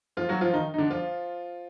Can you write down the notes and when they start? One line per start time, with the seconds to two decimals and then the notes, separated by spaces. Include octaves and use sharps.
0.17 F3 F4
0.29 F#3 F#4
0.41 F3 F4
0.53 D#3 D#4
0.74 D#4
0.78 D3 D4
0.90 F3 F4